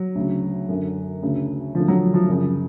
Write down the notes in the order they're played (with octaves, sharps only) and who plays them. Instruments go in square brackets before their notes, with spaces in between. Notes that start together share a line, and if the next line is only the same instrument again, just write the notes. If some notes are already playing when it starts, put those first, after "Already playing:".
Already playing: [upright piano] F#3
D2 C#3
F#2 D3
D2 C#3
D2 D3 F3
F#3
F3
F#2 C#3